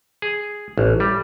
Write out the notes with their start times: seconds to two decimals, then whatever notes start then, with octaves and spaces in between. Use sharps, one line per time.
0.22 G#4
0.78 A1
1.00 G3